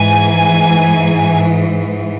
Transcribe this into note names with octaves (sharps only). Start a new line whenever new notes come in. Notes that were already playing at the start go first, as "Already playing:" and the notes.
Already playing: G#2 E3 G#5